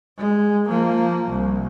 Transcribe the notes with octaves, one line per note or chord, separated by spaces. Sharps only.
G#3
F3 A#3
C2